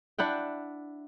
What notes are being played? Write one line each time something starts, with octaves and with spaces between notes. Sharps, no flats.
D4 E4 F#5 G5